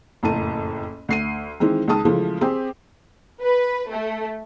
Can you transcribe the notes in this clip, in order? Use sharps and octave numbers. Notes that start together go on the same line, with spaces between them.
F#1 F2 A2 A3 A5 D#7
D2 C7 D#7
D#3 E3 G#3 C4
C#2 D#3 G#3 A5 D#6
C#3 E3 F3 G#3 A3
C4 G4 G#4
B4
A3